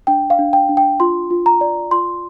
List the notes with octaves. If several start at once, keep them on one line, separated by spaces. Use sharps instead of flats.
D4 G5
F5
D4
G5
D4
G5
F4 C6
F4
A#5
D5
F4 C6